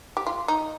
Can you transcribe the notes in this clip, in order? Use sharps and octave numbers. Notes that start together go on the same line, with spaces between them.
G4
F4
D#4